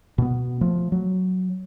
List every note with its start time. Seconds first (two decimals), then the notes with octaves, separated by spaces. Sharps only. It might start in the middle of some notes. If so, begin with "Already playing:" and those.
0.18 B2 B3
0.61 F3 A3
0.92 F#3